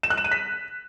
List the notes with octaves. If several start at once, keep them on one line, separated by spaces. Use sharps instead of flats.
E7
F#6
E7
D#7
B6